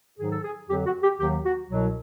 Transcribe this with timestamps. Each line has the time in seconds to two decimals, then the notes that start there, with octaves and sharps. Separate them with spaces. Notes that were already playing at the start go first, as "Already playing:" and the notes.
0.18 G#2 D#3 F#3 G#4
0.31 A4
0.43 G#4
0.69 F2 D3 F#3 G4
0.86 F#4
1.03 G4
1.19 D#2 D#3 F#3 G4
1.44 F#4
1.70 C2 B2 F#3